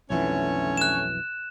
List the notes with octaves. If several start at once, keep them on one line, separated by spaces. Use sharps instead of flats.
B1 F2 D3 E3 A3 C#4 C#5
F#6 E7